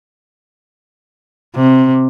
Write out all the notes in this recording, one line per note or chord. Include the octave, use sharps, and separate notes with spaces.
C3